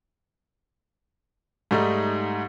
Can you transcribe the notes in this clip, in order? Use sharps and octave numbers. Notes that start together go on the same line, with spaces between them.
G#2 G3 A3 D#4